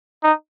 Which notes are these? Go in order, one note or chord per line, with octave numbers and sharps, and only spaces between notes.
D#4